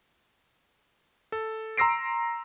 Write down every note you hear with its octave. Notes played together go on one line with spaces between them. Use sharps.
A4
A#5 C6 E6 A#6 C7 D7